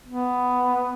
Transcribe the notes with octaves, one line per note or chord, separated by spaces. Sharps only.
B3